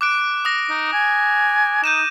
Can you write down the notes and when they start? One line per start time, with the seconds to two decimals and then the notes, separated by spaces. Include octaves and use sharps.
0.01 D6 F#6 D7
0.45 D#6 A#6
0.70 D#4
0.93 G#5
1.84 D#4 G6 D#7 E7